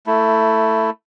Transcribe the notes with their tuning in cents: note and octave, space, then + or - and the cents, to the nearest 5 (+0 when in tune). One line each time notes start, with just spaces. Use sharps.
A3 +15 E4 +0